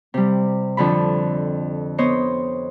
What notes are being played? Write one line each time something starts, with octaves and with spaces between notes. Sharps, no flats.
C3 G3
F2 D3 B5
B3 C5 C#5 D#5